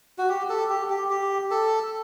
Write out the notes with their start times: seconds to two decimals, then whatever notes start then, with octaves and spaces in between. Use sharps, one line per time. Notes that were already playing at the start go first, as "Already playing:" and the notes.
0.18 F#4
0.29 G4
0.50 A4
0.70 G4
0.90 G4
1.10 G4
1.51 A4